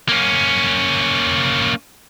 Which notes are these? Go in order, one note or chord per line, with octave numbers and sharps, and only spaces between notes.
A#3 C#4